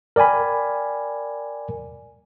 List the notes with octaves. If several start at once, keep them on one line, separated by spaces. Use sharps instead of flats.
A#4 D5 G5 G#5 B5